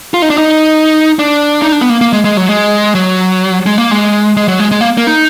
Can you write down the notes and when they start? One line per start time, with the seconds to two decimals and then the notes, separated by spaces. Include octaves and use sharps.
0.14 F4
0.22 D#4
0.30 D4
0.38 D#4
1.19 D4
1.62 D#4
1.72 D4
1.81 B3
1.89 A#3
2.01 A#3
2.13 G#3
2.25 G#3
2.37 F#3
2.49 G#3
2.95 F#3
3.66 G#3
3.78 A#3
3.91 G#3
4.37 G#3
4.48 F#3
4.60 G#3
4.71 G#3
4.81 A#3
4.98 A#3
5.07 D#4